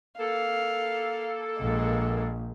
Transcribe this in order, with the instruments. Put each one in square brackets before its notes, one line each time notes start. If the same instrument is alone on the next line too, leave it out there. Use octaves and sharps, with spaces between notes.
[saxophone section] A#3 A4 [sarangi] F5
[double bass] A#1 [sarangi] G#3